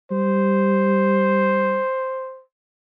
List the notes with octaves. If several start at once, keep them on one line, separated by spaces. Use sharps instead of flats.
G3 C5